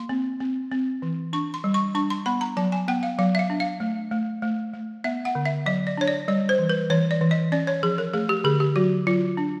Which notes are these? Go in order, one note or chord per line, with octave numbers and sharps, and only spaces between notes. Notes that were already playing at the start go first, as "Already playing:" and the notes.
Already playing: A#3 C6
C4
C4
C4
E3
D4 C#6
C6
G3
C#6
D4 C#6
C6
B3 B5
A#5
F#3 A5
G#5
B3 G5
F5
F#3 F5
E5
F5
D4
F5
A3
A3
A3
A3
B3 E5
F#5
D3
E5
F#3 D#5
D5
D4 C#5
D5
G3 D5
C5
E3
B4
E3 C#5
D5
E3
D#5
C#4 D5
C#5
F3 G#4
A#4
A3 G#4
G4
D3 G#4
G4
F#3 F#4
F#3 F4
D4